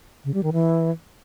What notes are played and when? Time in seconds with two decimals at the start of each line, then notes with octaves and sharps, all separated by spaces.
0.25 C#3
0.34 G3
0.43 D#3
0.53 E3